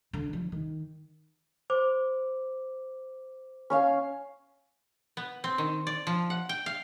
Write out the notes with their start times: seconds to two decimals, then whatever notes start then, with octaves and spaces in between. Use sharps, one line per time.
0.13 D3
0.33 F3
0.52 D#3
1.70 C5 D6
3.70 C#4 C#5 F5
5.17 B3
5.44 C4
5.58 D#3
5.87 D5
6.07 F3
6.30 F#5
6.49 G5
6.66 F5